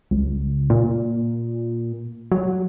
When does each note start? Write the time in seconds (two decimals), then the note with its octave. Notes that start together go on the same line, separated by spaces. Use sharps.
0.11 C#2
0.70 A#2
2.32 F#3